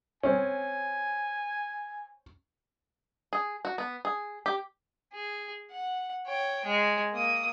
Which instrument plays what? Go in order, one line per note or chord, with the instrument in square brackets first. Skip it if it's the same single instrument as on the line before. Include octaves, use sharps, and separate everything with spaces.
[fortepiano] C4 C#4 [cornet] G#5
[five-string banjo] G#4
F#4
B3
G#4
G4
[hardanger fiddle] G#4
F#5
C#5 G5
G#3
A#3 D#6